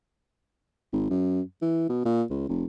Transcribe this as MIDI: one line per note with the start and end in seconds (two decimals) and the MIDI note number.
0.93 1.08 32
1.10 1.41 42
1.62 1.88 52
1.89 2.04 47
2.05 2.23 46
2.30 2.47 37
2.49 2.65 29